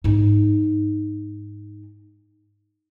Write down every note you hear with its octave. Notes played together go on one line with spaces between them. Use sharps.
G#2 D#4